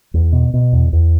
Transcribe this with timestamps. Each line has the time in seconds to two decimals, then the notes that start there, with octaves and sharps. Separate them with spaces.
0.14 E2
0.33 B2
0.54 B2
0.73 E2
0.93 E2